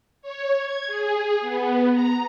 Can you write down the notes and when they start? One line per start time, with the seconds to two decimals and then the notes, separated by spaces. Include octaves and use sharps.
0.22 C#5
0.58 G#6
0.87 G#4
1.41 B3
1.92 A#5